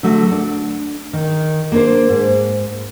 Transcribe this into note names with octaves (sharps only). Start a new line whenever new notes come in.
D3 F#3 A3
D4
D#3
A#3 D4 C5
G#2